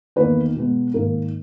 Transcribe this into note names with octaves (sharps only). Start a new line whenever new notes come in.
E2 D#3 A#3 B4
B2 G#3 B3
G#2 D#3 A#3 A#4